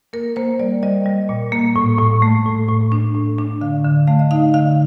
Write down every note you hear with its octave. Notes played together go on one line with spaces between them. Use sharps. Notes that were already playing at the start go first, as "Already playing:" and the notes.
A#3 A#4
A#3 C5
G3 D5
G3 D#5
G3
A#2
A#3
A2
A2
A3
A2
A2
D4
A2
D4
D3 F5
D3
A3 F5
D#5
D#4 F5
D3 F5